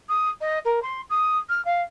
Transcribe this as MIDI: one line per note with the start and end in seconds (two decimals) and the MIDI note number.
0.08 0.29 87
0.41 0.59 75
0.65 0.79 70
0.82 1.01 84
1.09 1.37 87
1.49 1.63 89
1.64 1.81 77